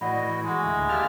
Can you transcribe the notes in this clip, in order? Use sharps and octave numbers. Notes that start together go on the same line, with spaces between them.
A2 E3 F#4 D5 D#5 F#5 B5
G#3 F#4
D2 E4
A#3 G4 E5 A5 F6 F7